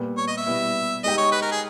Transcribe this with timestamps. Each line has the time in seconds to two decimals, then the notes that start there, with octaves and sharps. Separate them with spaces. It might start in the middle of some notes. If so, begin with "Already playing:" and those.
Already playing: A#2 G3 B3
0.18 C#5
0.28 D#5
0.37 E5
0.47 B2 G3 B3 E4
1.04 G#3 D#4 G4 D#5
1.18 C#5
1.32 B4
1.42 A#4
1.52 G#4